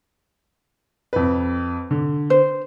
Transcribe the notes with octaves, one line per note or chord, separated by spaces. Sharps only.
F2 B4
D3
C5